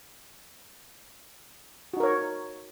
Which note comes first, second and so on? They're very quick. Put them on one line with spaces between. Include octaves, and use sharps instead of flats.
F#4 D#4 A#4 C#5